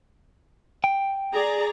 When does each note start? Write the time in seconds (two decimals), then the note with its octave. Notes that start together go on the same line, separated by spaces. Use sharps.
0.84 G5
1.33 G#4 D5 A#5